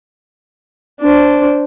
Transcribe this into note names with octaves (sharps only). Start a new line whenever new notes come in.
D4 C5